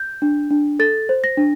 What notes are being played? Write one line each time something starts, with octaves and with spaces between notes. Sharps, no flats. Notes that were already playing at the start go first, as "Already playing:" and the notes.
Already playing: G6
D4
D4
A4 A6
C5
A#6
D4